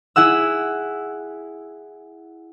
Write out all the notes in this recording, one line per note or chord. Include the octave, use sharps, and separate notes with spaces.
E4 G#4 F#5 E6